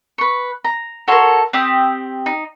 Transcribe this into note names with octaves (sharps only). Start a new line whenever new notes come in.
B4 C#6
A#5
F#4 A4 A#4 C#5 C6
C4 G4 G5 D#6
D#4